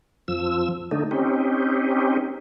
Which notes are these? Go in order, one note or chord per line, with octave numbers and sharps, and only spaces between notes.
F2 F3 E6
D3 A3 D#4
C4 C#4 D#4 G4